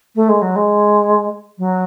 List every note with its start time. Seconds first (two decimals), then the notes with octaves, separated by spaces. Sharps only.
0.15 A3
0.28 G#3
0.41 F#3
0.55 G#3
1.58 F#3